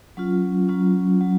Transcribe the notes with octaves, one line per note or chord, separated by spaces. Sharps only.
F#3 C#4 F4
F#3 C#4 F4
F#3